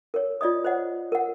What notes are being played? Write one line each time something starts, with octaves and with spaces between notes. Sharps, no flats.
A#4 C#5
F4 D5 D#5 D#6
C5 C#5 D#5 F#5
A#4 F#5